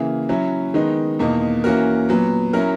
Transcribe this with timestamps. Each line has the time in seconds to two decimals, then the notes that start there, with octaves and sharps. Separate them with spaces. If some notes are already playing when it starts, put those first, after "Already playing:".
Already playing: C#3 E3 A#3
0.29 F#3 C#4 E4
0.74 D#3 G#3 B3 D#4
1.19 E2 B2 A#3 D#4
1.64 E3 A#3 C#4 F#4 A#4
2.09 A#2 F#3 B3
2.53 F#3 C#4 E4 A#4